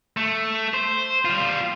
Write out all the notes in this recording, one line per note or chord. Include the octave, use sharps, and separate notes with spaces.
A3
C5
G3 F4